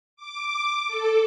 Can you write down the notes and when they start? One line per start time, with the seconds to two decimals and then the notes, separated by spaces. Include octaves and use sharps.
0.16 D6
0.88 A4